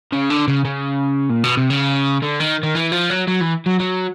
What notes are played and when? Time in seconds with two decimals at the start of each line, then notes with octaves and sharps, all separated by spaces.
0.12 C#3
0.30 D3
0.48 C#3
0.65 C#3
1.30 A#2
1.44 B2
1.57 C3
1.70 C#3
2.23 D3
2.40 D#3
2.63 D#3
2.75 E3
2.92 F3
3.10 F#3
3.27 F#3
3.41 E3
3.66 F#3
3.80 F#3